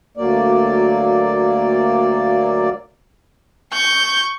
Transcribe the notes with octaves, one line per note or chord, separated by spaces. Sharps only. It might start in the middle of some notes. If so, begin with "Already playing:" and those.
D2 F#3 A#3 D5
C#6 G6